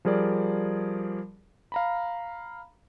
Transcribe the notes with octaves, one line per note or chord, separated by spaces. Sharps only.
F3 G3 G#4 A#4 D5
F5 A#5 B5